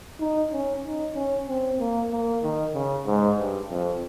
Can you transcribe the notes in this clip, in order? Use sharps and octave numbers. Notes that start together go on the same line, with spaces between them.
D#4
C#4
D#4
C#4
C4
A#3
A#3
D#3
C#3
G#2
G2
F2